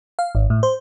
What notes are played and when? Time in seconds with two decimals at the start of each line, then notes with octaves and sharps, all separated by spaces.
0.19 F5
0.35 G#1
0.50 A2
0.63 C5